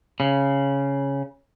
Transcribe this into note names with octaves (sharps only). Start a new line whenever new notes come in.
C#3